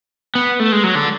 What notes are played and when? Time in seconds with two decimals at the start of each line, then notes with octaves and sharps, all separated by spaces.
0.35 B3
0.60 A3
0.72 G#3
0.84 F#3
0.95 D3